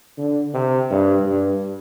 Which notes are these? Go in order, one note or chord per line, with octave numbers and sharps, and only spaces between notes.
D3
C3
G2
G2